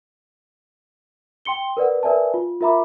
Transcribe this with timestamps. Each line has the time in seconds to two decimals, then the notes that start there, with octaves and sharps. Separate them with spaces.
1.45 G5 C6 C#7 G7
1.77 A#4 B4 D5 F#5
2.03 A#4 B4 D5 E5 G#5 A5
2.34 F4
2.61 F4 A#4 E5 A#5 B5 D6